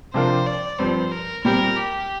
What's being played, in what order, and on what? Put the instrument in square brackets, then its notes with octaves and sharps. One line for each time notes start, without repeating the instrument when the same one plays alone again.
[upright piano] C3 F3 D4 F4 A#4 [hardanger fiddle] C5
[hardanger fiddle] D5
[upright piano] G2 F3 C4 [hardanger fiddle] C5
[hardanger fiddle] A#4
[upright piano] A#2 G3 C4 G4 [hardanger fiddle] A#4
[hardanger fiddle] G4